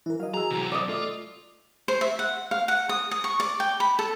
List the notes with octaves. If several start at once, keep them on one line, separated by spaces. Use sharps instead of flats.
E3 E4 A#4
F#3 D#5 F5
F#4 G#4 A#5 E6
C3 E3 F#3
D5 D#5
A3 F4
C5
E5
F#5
F5
F#5
D#6
D#6
C#6
D5
G5
B5
A4